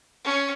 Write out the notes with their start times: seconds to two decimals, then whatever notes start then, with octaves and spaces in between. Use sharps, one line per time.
0.25 C#4